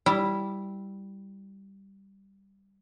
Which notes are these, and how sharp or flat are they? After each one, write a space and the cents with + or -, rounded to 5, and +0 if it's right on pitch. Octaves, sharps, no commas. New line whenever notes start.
G3 +0 E4 +0